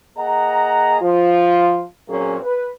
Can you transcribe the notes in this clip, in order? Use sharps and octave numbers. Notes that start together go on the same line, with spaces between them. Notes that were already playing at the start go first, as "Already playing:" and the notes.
A#3 G#4 D#5 F#5 A#5
F3 F4
A#2 F#3 A#3 C4 C#4 G#4
B4